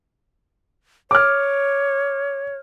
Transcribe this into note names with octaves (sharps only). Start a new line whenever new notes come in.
C#5 D6 F6